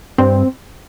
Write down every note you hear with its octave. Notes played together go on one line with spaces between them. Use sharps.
G2 C4